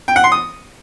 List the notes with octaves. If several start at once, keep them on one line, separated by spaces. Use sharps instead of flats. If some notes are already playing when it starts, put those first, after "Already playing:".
G5
F#5
C6
D#6